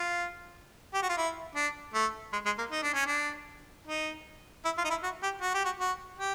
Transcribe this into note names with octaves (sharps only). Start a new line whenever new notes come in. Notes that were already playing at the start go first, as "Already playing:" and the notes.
Already playing: F4
G4
F#4
F4
E4
D4
A3
G#3
G#3
A#3
D#4
D4
C#4
D4
D#4
E4
F4
D#4
E4
F#4
G4
F#4
G4
F#4
F#4
G4